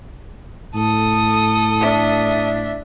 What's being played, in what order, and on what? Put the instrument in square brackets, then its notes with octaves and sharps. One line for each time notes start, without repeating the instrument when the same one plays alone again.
[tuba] A2 [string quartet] A4 D#6
[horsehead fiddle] D4 E5